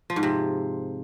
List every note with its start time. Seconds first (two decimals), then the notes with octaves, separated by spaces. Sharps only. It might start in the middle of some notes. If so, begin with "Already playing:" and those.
0.10 F3
0.16 G#2
0.23 C3